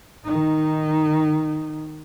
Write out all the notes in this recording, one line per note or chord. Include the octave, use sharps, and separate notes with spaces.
D#3 D#4